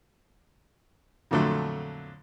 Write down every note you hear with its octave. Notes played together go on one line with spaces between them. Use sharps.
F2 A#2 D3 F#3 A3